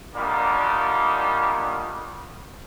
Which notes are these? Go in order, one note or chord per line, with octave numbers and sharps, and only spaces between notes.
A#2 D3 D#3 G3 A#3